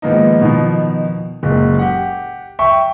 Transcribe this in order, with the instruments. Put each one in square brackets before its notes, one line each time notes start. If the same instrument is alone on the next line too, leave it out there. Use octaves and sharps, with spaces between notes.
[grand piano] G#2 D#3 F3 A#3 B3 D#4
B2 D#3 F3
F#1 A#2 G#3
G4 F#5
E5 G5 C#6